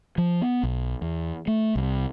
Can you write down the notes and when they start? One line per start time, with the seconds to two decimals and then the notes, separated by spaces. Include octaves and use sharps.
0.18 F3
0.41 B3
0.63 B1
1.02 E2
1.47 A3
1.76 C2